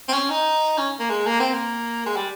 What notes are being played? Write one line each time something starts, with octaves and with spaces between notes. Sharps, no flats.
C4
C#4
D#4
C#4
A#3
G#3
A#3
C4
A#3
G#3
G3